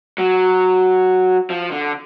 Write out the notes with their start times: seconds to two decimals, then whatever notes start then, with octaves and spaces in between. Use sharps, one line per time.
0.18 F#3
1.50 F3
1.71 D3